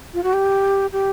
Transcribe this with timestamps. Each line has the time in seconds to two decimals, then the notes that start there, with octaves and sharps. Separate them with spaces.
0.14 F4
0.23 F#4
0.33 G4
0.92 G4